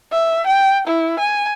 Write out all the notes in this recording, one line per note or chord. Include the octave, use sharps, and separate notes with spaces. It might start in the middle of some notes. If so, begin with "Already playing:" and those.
E5
G5
E4
G#5